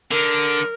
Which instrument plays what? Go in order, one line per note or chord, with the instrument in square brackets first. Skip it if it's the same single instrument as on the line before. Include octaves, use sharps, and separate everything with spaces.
[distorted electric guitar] D3 [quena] A#4